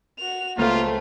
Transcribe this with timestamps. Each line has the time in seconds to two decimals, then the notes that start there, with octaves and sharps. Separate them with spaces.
0.19 F#4 F7
0.58 C#2 A3 A#3 C4 F4 A5